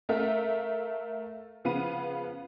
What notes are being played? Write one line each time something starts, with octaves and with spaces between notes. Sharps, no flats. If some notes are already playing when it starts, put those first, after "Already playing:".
A3 A4 A#4 E5 F5
C#3 F3 B3 F5 B5 D#7